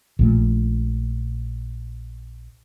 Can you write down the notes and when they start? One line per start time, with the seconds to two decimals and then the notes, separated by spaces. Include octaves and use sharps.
0.19 A#1 A#2 A3